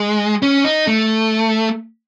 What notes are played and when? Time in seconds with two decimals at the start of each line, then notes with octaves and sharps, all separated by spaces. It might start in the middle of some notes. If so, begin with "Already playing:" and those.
Already playing: G#3
0.42 C#4
0.64 D#4
0.87 A3